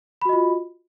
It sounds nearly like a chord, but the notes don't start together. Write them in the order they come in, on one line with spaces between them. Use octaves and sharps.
B5 F#4 D#5 F4